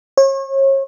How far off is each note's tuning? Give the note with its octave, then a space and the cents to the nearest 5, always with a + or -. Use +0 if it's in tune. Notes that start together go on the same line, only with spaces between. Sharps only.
C#5 -35